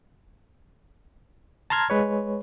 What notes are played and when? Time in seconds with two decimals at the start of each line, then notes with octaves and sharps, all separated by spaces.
1.70 A5 A#5 C6 F6 G#6
1.90 G#3 B4 C#5